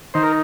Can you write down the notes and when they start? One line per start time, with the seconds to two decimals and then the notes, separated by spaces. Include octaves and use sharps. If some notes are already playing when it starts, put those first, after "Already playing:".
0.14 D#3 C5
0.23 A#4